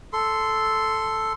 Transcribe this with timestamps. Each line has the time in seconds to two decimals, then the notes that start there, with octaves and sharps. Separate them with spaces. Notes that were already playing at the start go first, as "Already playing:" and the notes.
0.13 A4 C6